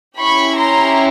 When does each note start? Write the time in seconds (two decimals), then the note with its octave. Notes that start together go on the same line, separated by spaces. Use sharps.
0.19 C#4 E4 G4 B5 C#6
0.57 A#5 C6